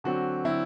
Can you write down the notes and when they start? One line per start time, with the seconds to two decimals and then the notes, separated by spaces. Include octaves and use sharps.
0.04 D3 F#3 C4 F#4
0.44 D3 F#3 C4 E4